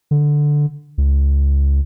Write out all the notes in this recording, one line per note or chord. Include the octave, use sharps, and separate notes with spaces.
D3
C#2